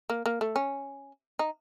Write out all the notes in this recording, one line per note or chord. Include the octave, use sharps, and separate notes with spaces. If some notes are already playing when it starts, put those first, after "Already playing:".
A#3
A#3
A3
C#4
D#4